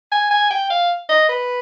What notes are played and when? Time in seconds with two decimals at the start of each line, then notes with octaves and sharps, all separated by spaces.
0.12 G#5
0.31 G#5
0.50 G5
0.70 F5
1.09 D#5
1.29 B4